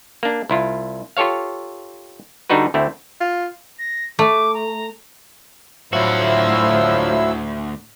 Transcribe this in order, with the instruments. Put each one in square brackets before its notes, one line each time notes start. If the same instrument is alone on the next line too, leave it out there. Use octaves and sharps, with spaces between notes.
[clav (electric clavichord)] A#3 D4
C2 E4 F4
F4 G4 A4 C#5 F5
D3 G3 D4 D#4 F#4 B4
D2 A3 C4 E4
[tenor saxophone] F4
[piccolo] A#6
[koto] A3 [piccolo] D6
[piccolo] A#5
[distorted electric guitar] D2 F#4 [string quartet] A2 C6 [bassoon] F3 [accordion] F#3 E4 E6